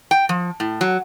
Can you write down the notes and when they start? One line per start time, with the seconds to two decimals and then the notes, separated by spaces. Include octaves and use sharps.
0.11 G5
0.29 F3
0.60 A2
0.81 F#3